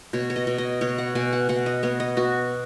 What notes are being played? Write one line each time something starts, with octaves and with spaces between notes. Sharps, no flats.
B2 C#5
C#5
D#5
B2
D#5
B2 C#5
F#5
B2 G#5
F#5
B2 F#5
D#5
B3 C#5
D#5
B3 F#4